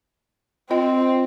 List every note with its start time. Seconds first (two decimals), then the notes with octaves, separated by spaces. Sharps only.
0.71 C4 F4 D#5 G5